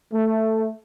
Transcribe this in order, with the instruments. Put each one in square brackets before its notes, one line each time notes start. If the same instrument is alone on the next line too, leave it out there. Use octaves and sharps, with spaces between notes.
[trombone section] A3